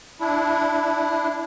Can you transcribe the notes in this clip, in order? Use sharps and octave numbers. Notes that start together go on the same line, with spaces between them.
D4 E4